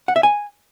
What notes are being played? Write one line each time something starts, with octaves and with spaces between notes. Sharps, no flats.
F#5
E5
G#5